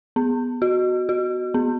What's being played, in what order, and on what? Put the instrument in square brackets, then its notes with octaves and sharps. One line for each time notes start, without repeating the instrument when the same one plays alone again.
[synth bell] B3
F#4
F#4
B3